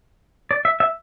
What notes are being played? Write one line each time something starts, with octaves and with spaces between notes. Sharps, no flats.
D5
E5
E5